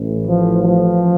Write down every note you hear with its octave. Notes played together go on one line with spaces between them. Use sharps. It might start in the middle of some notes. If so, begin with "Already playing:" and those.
Already playing: A1 A2 E3
F3
F3